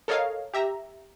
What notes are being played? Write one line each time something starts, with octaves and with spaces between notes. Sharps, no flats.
A4 A#4 C#5 D#5 F5
G4 E5 A#5